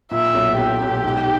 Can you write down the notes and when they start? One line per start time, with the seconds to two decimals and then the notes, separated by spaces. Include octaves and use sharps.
0.11 A#2 E5
0.34 B1
0.57 B1 G4
0.81 B1
1.04 G#2